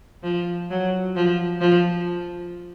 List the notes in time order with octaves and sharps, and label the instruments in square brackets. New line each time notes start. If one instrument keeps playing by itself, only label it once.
[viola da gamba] F3
F#3
F3
F3